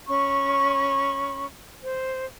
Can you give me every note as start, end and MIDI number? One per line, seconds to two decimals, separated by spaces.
0.07 1.45 61
0.07 1.45 83
0.07 1.45 85
1.82 2.24 72